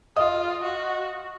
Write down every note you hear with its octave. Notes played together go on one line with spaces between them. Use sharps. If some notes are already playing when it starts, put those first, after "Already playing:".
F4 D#5 D#6
F#4